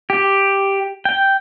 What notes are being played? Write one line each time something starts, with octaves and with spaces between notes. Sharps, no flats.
G4
G5